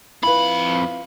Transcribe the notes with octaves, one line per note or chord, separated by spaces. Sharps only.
F2 E4 F4 B4 B5